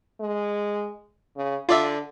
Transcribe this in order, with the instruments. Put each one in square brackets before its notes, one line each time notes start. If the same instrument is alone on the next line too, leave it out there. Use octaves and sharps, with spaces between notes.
[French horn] G#3
C#3
[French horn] D3 [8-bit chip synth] F4 D5 E5